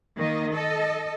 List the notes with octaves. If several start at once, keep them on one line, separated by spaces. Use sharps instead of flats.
D#3 A#3 D#5
A4 D#5